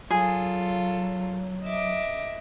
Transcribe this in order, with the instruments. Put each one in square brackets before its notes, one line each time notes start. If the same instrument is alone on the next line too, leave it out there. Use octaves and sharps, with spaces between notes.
[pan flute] F#3 [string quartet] F4 A4 [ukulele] G#4
[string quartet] D#5 E5 D6